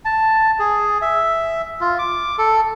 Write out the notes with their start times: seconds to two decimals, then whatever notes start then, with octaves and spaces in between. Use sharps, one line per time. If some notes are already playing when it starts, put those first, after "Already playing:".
0.05 A5
0.59 G#4
1.02 E5
1.81 F4
1.99 D6
2.38 A4